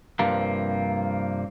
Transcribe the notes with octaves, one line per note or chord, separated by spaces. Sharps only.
G2 C3 F3 A#3